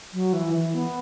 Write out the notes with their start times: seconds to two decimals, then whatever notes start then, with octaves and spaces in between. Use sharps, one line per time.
0.13 F#3
0.33 E3
0.54 E3
0.74 B3